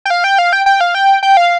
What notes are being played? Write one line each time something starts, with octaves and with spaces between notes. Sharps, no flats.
G5
F5
G5
F5
G5
G5
F5
G5
G5
F5